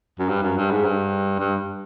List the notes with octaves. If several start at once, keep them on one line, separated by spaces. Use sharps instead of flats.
F#2
G2
F#2
G2
G#2
G2
G2